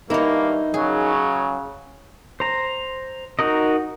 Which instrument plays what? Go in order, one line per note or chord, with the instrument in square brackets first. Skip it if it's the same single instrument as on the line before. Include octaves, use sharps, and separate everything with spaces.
[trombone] G2 [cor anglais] A#3 [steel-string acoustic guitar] D#4 A#4 [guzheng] E4 C#5
[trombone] C#3 [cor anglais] F#3 [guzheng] G#4
[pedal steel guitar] C5 A#5
D#4 F#4 A#4 D#5